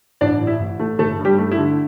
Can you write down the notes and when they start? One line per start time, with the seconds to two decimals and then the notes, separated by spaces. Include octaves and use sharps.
0.21 A1 D4 D5
0.41 A2
0.47 E4 E5
0.60 A1
0.80 A3
0.99 G1 A3 A4
1.19 G2
1.25 G3 G4
1.38 A3
1.51 E4
1.58 D3